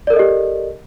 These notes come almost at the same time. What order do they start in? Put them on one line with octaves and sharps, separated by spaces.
D5 A#4 A4 D#5 G4